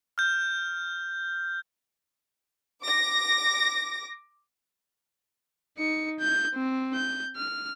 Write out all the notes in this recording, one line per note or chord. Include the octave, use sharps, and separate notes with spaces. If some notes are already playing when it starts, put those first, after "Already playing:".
F6 G6
D6 A#6
D#4 C#7
G6
C4
G6
F6